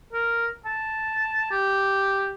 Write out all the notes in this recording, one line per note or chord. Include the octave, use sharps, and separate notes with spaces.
A#4
A5
G4